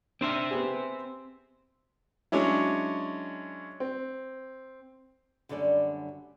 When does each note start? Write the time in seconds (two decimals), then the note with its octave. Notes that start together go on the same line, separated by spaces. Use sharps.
0.21 C4 D4 C5 E5 F6
0.51 B3 G4 G#4
2.32 F#3 G#3 C#4 D4 E4
3.80 C4
5.49 F#2 D3 G3 A3 C#4 D5